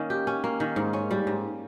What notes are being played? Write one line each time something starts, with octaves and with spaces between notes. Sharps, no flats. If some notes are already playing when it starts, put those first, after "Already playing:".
Already playing: D#3 A#3 C#4
G4
C#4
A#3
D#3
G#2
C#4
G3
G#2